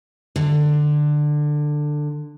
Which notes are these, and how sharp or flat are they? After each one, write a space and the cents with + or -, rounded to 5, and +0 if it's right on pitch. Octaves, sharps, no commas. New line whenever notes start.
D3 +15